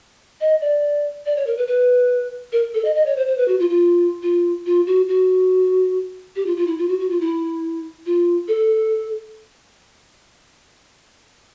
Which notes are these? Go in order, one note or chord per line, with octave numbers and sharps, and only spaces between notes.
D#5
D5
D5
C#5
A#4
B4
B4
A#4
A4
D#5
D#5
C#5
C5
C5
B4
F#4
F4
F4
F4
F4
F#4
F#4
G4
F4
F4
E4
F4
F#4
F#4
F4
E4
F4
A4